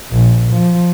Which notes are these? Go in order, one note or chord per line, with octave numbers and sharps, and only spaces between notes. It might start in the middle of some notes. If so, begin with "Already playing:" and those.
A#1
F3